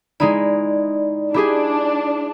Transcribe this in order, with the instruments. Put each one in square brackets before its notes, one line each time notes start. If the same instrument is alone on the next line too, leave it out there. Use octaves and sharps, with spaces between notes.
[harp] G#3 D#4 E4 [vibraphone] D5
[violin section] D4 [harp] E4 G4 G#4